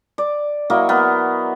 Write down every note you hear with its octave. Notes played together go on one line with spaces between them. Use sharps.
D5
F#3 A#3 E4 D#5
B3 A#4